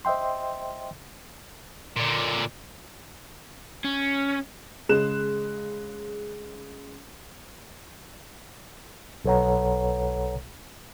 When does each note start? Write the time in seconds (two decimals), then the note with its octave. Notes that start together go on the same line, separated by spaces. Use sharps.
0.05 C5 D#5 E5 G5 C6
1.96 A#2 D3
3.84 C#4
4.89 C#3 G#3 F#6 E7
9.25 B1 A4 B4 C#5 F#5 A#5